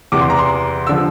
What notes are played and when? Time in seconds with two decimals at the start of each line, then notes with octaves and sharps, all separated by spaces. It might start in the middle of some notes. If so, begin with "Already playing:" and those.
0.12 E2 C3 E3 D6
0.21 C6
0.30 A#5
0.39 C6
0.87 D3 F3 E6